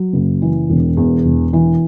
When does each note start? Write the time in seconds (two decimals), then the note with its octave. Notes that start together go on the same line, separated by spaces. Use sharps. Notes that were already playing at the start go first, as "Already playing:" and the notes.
Already playing: F#3
0.13 F#1
0.42 E3
0.70 E1
0.97 E2
1.25 E1
1.53 E3